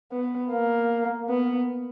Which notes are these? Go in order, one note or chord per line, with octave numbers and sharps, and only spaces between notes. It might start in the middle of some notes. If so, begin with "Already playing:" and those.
B3
A#3
B3